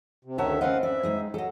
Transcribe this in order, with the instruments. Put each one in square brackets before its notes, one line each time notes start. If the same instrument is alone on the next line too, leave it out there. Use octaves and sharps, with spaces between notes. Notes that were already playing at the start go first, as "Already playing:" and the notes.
[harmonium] C3
[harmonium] D2 D#3 E5 [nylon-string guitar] C#4 C#5 [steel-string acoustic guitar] F#5 A5 A#5
[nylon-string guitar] C4 B4 C5 [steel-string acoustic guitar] C#4 D#5 [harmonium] F5 F#5
[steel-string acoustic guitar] D5 [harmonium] E5
[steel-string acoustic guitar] G#3 D#4 G#4
[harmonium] F#3 [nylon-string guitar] G#4 D#5 [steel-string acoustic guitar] A4